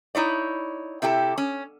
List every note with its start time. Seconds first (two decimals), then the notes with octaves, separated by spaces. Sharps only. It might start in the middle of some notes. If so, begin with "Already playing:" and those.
0.15 D#4 E4 C#5 D5
1.02 C3 E4 G4 A4
1.38 C#4